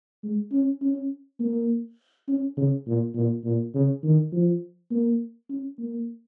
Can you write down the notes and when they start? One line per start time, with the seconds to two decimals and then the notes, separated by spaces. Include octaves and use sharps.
0.24 G#3
0.52 C#4
0.82 C#4
1.40 A#3
2.28 C#4
2.57 C#3
2.87 A#2
3.15 A#2
3.44 A#2
3.74 C#3
4.03 D#3
4.32 F3
4.91 A#3
5.49 C#4
5.79 A#3